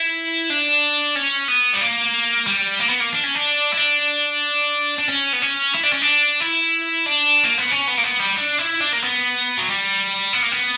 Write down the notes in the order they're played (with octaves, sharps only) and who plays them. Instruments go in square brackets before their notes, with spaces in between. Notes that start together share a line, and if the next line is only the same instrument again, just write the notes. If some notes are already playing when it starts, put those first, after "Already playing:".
Already playing: [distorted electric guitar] E4
D4
C#4
B3
G3
A#3
G3
A#3
B3
A#3
D4
C#4
D4
E4
D4
D4
C#4
B3
C#4
E4
D4
C#4
D4
E4
D4
A#3
B3
C#4
B3
A#3
B3
G3
D4
E4
D4
A#3
B3
F#3
G3
B3
A#3
B3